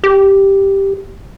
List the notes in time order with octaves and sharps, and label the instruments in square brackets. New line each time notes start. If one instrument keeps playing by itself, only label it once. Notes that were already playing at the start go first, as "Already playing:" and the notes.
[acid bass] G4